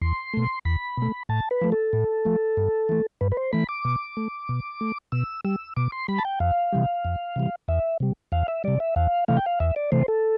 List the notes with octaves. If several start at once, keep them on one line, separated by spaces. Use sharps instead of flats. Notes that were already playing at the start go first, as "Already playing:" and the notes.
E2 C6
B2 A3
E2 B5
B2 A3
A2 A5
B4
F3 A3
A4
A2
F3 A3
G2
E3 A3
G2 B4
B4
C5
E3 A3 B5
D6
B2
A3
B2
A3
B2 E6
G3 E6
B2 D6
C6
G3 B5
A5
G5
F2 F5
C3 E3 G3
F2
C3 E3 G3
E2 E5
C3 G3
E2 F5
E5
C3 G3 D5
E5
E2 F5
C3 E3 A3 F5
G5
F5
E2 E5
D5
C3 E3 A3 C5
A4